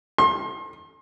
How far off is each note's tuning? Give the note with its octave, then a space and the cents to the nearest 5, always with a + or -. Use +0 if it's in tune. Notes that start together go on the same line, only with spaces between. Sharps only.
C6 +35